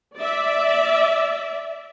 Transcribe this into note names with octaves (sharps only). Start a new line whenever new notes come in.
D5 E5